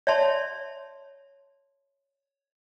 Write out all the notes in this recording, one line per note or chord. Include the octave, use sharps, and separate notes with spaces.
C#5 D5 E5 A5 C6